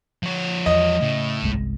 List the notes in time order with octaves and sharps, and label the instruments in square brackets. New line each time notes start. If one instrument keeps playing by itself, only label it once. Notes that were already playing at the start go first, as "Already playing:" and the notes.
[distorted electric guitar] F3 C#5
[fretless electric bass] E2 [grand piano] D#5
[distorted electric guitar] A2 [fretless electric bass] C#3
[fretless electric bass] G1 C2 G#3